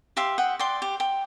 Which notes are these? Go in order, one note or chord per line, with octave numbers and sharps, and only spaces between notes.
G4 E5 F5 C6
F#5 G5 D#6
D5 G5 C6
G4
G5